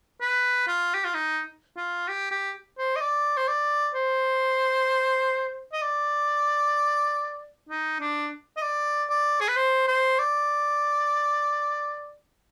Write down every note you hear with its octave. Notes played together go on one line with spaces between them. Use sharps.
B4
F4
G4
F4
D#4
F4
G4
G4
C5
D#5
D5
C5
D5
C5
D#5
D5
D#4
D4
D#5
D5
D5
G#4
B4
C5
C5
D5